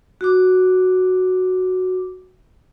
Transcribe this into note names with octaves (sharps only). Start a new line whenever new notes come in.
F#4 D6